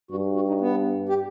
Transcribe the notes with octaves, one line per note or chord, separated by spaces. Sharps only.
G2 F#4
F#4
D#4
B3
G4